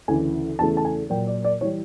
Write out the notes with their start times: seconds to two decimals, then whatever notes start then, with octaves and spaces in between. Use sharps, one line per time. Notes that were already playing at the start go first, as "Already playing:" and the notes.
0.08 D2 C#3 E3 G#5
0.59 E2 C#3 E3 A3 A5
0.77 A5
0.85 G#5
1.10 A#2 F#3 A#3 G5
1.27 D5
1.44 D5
1.61 E3 G3 C#5